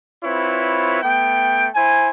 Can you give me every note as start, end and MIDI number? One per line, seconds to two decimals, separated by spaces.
0.24 1.01 60
0.24 1.01 64
0.24 1.01 65
0.24 1.01 71
0.24 1.01 73
1.02 1.68 57
1.02 1.68 59
1.02 1.68 79
1.75 2.10 64
1.75 2.10 72
1.75 2.10 80